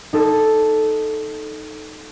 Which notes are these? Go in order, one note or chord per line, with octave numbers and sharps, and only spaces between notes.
D#4 A4